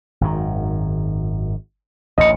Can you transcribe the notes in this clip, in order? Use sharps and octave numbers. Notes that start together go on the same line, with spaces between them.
G#1 F#2 D#3
A1 D2 A2 D#5 C#7